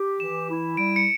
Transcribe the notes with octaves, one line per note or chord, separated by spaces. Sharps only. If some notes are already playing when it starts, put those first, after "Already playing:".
Already playing: G4
E3 E7
E4
G3 D7
C#7